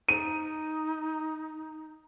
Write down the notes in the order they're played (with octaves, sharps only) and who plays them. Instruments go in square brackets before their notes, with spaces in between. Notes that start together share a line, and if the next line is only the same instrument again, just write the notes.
[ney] D#4 [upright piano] D#7